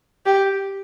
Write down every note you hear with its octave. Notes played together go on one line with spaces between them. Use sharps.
G4